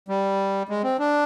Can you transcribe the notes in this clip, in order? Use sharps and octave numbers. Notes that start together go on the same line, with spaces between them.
G3
G#3
C4
D4